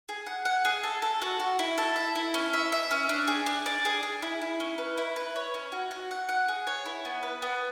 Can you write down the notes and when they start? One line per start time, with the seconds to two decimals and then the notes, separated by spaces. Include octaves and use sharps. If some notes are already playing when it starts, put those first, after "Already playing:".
0.09 G#4
0.26 F#5
0.45 F#5
0.65 G#4
0.83 A4
1.02 A4
1.22 F#4
1.40 F#4
1.59 E4
1.78 A4
1.96 E5
2.15 E4
2.34 C#4
2.53 E5
2.72 E5
2.91 C#4
3.09 D4
3.27 G#4
3.46 D4
3.66 D5
3.85 G#4
4.03 G#4
4.22 E4
4.42 E4
4.60 C#4
4.78 B4
4.98 E4
5.16 B4
5.36 C#5
5.54 C#4
5.72 F#4
5.91 F#4
6.11 F#5
6.29 F#5
6.48 G#4
6.67 C#5
6.86 E4
7.05 B3
7.23 B4
7.42 B3